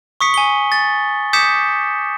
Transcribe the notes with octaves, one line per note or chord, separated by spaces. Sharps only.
C#6 D#6 B6 C#7
G#5 G7
A6
D6 D#6 G6 B6 C#7 E7